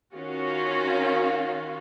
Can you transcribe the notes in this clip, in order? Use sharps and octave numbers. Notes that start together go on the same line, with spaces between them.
D#3 C#4 F4 F#4 F5